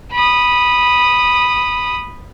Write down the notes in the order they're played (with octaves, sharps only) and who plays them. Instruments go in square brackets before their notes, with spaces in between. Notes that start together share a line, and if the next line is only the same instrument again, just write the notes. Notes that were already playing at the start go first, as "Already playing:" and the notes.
[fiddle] B5 D#6